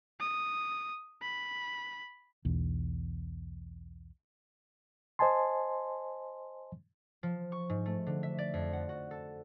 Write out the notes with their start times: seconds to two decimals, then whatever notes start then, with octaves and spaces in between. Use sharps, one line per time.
0.20 D#6
1.22 B5
2.45 B1 E2
5.19 C5 D#5 G#5 A5 C6
7.23 F3
7.52 C#6
7.69 G#2
7.86 A3
8.06 D3
8.23 E5
8.38 D5
8.54 F2
8.73 F#5
8.89 F#4
9.11 A4